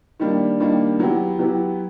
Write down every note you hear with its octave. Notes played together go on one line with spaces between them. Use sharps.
D#3 G3 A#3 D4
D#3 G3 A#3 D4
F#3 B3 E4 G4
F#3 B3 E4 G4